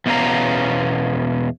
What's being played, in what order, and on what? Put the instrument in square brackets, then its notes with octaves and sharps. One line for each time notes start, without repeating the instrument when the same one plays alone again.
[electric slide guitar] E2 B2 B3 C#4 F5 A#5